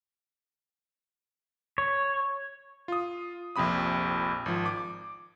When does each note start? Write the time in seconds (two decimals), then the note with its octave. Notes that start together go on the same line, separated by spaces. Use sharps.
1.78 C#5
2.88 F4 D#6
3.56 A#1 F2 C3 B5 D#6
4.46 G#1 F3
4.66 D6